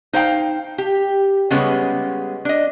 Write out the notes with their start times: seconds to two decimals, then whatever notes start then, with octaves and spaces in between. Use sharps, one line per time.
0.13 D#4 C5 F5 G5
0.78 G4
1.50 C#3 G3 G#3 B3 C#4
2.45 D4 D#5